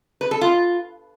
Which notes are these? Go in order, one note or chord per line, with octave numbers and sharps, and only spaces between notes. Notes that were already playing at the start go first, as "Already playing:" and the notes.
B4
A4
F4